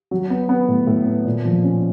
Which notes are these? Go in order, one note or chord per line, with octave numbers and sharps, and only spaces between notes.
F#3
B3
B3
A2
A2
B3
A#2
F3
C#4